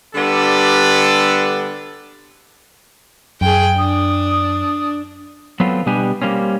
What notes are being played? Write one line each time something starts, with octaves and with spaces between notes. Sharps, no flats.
D3 G3 B3 D4 A4
F#2 G#4 G5
D4 D#6
F#3 B3 C4 F4 A4 B4
B2 G3 B3 D4 G4 G#5
G3 A#3 C4 C#4